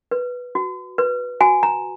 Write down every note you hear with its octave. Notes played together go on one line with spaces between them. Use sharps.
B4
F#4
B4
F#4 G#5
A#5